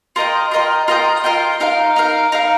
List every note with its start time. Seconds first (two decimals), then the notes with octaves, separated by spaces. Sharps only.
0.16 F4 A#4 D#5 G5
0.51 F4 A#4 D#5 G5
0.88 F4 A#4 D#5 G5
1.24 F4 A#4 D#5 G5
1.60 D#4 A#4 F5
1.96 D#4 A#4 F5
2.32 D#4 A#4 F5